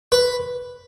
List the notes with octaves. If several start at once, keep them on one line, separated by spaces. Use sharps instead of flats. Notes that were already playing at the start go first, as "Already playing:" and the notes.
B4